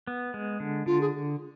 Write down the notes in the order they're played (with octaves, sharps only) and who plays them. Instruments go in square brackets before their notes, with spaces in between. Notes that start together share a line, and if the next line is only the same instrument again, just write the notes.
[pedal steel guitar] B3
G#3
D3
[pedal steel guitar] D3 [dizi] F4
[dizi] G#4